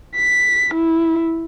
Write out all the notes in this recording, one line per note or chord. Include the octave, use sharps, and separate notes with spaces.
B6
E4